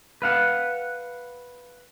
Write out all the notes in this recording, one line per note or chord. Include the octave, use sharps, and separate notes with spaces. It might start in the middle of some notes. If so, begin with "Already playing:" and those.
B4 F5 F#5